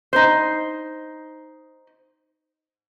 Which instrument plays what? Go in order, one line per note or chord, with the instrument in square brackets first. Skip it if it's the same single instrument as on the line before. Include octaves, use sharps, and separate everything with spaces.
[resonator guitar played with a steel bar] D#4 C5